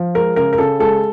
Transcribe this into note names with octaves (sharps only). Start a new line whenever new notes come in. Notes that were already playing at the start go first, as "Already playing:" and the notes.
Already playing: F3
G#3 A#4
C#3 A#4
A#4
C#3 A4
G#3 A4